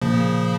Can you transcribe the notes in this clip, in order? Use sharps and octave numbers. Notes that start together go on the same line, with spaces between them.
A#2 C#3 F3